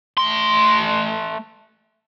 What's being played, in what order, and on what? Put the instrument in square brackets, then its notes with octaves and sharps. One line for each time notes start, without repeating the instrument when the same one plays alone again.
[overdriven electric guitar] A3 C6